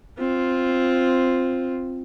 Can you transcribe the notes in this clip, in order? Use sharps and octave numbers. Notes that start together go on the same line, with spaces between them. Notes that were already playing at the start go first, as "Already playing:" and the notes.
C4 F4